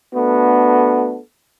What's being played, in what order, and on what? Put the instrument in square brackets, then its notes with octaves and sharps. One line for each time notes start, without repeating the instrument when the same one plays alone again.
[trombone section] A3 B3 D4 F#4 A4